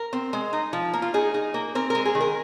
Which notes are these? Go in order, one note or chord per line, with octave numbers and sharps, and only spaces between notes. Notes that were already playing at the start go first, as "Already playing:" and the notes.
Already playing: A#4
C4
G#3
D#4
F3
A#3
F4
D#4 G#4
D#4
A#3
C4 A#4
G#3 A#4
G#4
D#3
A#4